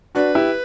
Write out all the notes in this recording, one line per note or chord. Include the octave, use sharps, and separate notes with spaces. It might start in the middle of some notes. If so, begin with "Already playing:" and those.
D4 F#4 B4
E4 G4